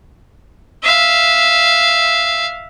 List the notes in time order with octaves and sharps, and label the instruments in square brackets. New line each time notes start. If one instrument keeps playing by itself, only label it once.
[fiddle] E5 F5